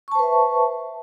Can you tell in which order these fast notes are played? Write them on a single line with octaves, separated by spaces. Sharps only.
C#6 A5 C5 B4 E5